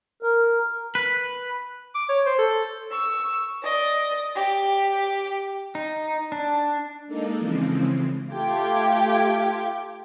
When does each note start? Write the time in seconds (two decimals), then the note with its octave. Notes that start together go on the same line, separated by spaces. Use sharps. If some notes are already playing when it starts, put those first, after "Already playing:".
0.23 A#4
0.95 B4
1.95 D6
2.09 C#5
2.26 C5
2.39 A4
2.91 C#6 E6
3.63 D5 D#5
4.36 G4
5.75 D#4
6.32 D4
7.07 G#3 A#3 D4 D#4 A4 D5
7.39 C#3 E3 F3 G#3 C4
8.33 A3 F4 G4 G5 D6 G#6